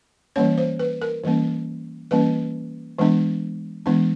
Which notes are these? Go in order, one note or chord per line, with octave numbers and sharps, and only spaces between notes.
E3 G3 A#3 C#4 C#5
C5
B4
A#4
E3 G3 A#3 C#4
E3 G3 A#3 C#4 B4
E3 G#3 B3 D4
E3 G#3 B3 D4